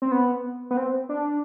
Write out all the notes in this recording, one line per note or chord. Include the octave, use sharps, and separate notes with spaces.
C4
B3
B3
C4
D4